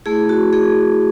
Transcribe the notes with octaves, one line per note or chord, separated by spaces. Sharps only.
A3 E4 G#4
F#4
G#4